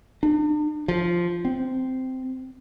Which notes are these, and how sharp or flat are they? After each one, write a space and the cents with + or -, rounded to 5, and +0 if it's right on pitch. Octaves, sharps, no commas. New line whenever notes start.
D4 +45
F3 -5
C4 -10